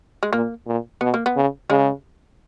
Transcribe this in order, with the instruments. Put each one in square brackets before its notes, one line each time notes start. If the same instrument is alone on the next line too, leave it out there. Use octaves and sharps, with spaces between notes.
[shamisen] G#3
[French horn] A#2 [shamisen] A#3
[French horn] A#2
[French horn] B2 [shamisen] B3
[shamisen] A#3
B3
[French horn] C#3
[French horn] C#3 [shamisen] G#3